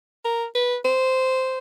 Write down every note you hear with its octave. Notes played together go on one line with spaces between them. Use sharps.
A#4
B4
C5